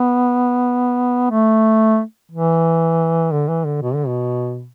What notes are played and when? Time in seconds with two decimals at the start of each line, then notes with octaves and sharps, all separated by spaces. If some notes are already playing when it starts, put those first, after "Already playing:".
Already playing: B3
1.31 A3
2.31 E3
3.32 D3
3.48 E3
3.65 D3
3.82 B2
3.94 D3
4.07 B2